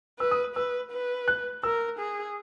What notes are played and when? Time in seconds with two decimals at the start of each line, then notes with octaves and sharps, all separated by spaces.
0.19 B4 E6
0.31 D#6
0.55 B4 E6
0.92 B4
1.28 F#6
1.63 A#4 E6
1.99 G#4